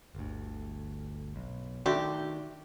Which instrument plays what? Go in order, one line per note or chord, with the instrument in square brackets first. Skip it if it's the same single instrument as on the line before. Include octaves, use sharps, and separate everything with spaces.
[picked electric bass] G1 D2
B1
[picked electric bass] D#3 [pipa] A3 D4 G4 [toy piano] F#4 E5